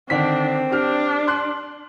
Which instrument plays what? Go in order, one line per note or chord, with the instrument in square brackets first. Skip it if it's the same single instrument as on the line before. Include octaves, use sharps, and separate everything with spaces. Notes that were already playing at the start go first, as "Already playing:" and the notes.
[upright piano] D3 D#3 B6 [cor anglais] C4 [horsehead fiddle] D4
[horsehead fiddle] D4 [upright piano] G4 F6
[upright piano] C6 F#6